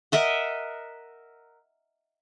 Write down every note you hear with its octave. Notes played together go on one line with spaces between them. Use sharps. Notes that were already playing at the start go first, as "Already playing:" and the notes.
A#4 D#5 E5 F#5